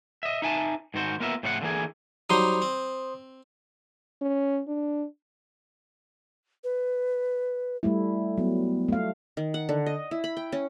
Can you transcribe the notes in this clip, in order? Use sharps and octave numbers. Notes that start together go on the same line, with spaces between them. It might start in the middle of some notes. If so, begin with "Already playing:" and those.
D#5 E5
D#4 E5 G#5 A5
G#2 D#3 F#4 C5
A#3 B3 F4 A#4 B4 E5
A2 C#3 F3 E4 F4 F#5
D3 E3 A#3 G#4
F#3 G3 D#4 C5 C6 D#6
C4
C#4
D4
B4
G3 A3 E4
F#3 B3
A3 F5
D#3
F#5
D3
D#5
E4
B5
G5
C#4